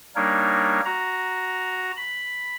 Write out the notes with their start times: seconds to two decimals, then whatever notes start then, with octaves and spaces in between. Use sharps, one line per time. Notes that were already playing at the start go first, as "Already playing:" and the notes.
0.16 G3 A#3 D4 D#4 A#4 C#5
0.85 F#4 A#5
1.97 B5